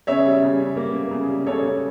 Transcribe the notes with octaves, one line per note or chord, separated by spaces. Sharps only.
C#3 C#5 E5
G3
C#3
C#3
A#3
A#3
C#3
G3
C#3 A4 C#5
C#3